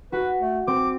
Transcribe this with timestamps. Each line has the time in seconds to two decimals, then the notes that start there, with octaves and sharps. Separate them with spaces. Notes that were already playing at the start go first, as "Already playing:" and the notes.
0.12 F#4 B4
0.40 A3
0.67 C4 D6